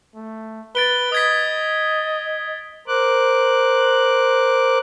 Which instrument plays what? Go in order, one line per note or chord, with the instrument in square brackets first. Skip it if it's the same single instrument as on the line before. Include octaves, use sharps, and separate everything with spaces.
[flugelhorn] A3
[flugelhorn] B4 [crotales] A6 D7 G7
[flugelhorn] D#5 [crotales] D#6 G#6 B6
[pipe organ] A#4 C5 D6 F#6